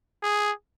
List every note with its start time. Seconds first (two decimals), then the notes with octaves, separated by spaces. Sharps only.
0.23 G#4